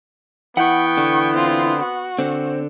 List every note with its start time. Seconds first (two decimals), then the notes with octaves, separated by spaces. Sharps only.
0.57 E3 B3 F#5 G5 C#6
0.97 D3
1.34 C4 F4
1.79 F#4
2.19 D3 C4